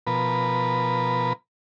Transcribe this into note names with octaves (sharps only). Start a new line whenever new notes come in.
B2 F3 A#4 B4